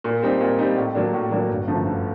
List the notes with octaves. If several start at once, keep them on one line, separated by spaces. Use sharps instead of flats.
A#2
G3 C4 D#4
A#2
G3 C4 D#4
A2
F#3 A#3 D4
A2
F#3 A#3 D4
G1
F#2 D3 F3 A3
G1